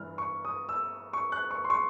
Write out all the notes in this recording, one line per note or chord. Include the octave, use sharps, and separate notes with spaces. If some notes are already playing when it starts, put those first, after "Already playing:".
Already playing: G2 E3 F6
C#6
D#6
E6
C#6
F#6
C#6
C6
C#6